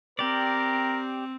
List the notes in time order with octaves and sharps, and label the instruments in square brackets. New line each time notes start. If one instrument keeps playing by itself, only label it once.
[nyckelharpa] C4 [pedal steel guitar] G4 D5 [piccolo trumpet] A#4